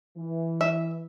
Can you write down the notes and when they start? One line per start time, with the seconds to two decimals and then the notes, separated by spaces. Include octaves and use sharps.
0.17 E3
0.61 E5